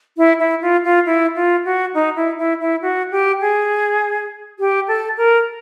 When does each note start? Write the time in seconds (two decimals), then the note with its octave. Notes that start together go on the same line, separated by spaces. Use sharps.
0.18 E4
0.39 E4
0.61 F4
0.84 F4
1.06 E4
1.35 F4
1.65 F#4
1.94 D#4
2.16 E4
2.38 E4
2.60 E4
2.82 F#4
3.11 G4
3.41 G#4
4.59 G4
4.88 A4
5.17 A#4